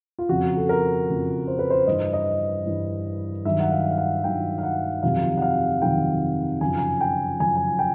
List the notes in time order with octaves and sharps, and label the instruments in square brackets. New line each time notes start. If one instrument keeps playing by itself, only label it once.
[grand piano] F4
F2 C#3 F3 F#4
A4
A#4
F2 C#3 F3
C5
B4
C5
G2 E3 D#5
D#5
G2 E3
G2 D#3 F#3 E5
F#5
F5
F5
F#5
G2 D#3 F#3 G5
F5
F#5
F2 C3 D#3 F#3 F5
F#5
F5
F2 C3 D#3 F#3 G5
F#2 C#3 F3 G#5
G#5
G5
F#2 C#3 F3 G#5
G#5
G5